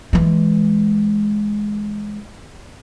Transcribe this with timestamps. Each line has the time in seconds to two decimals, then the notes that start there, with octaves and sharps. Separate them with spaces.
0.13 E3 G#3